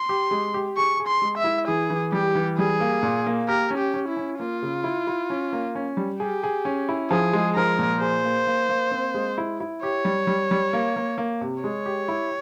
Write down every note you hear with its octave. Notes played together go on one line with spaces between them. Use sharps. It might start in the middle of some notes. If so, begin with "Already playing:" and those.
Already playing: C6
G4
G#3
G4
G#4 C#6
G#4
C6
G#3
E5
E4
E3 G#4
E3
G3 G4
E3
G3 G#4
A#3
A#2
A#3
G4 A#4
C#4
G4
C#4
E4
C#4
A#3 F4
C#3
E4
E4
C#4
A#3
C#4
G3
G4 G#4
G#4
C#4
E4
F3 G#4
G#3
F3 A#4
A#2
G#4 C5
A#3
A#3
A#3
C4
G#3
E4
E4
G4 C#5
G3
G3
G3
A#3
A#3
A#3
C3
G#3 C#5
G4
E4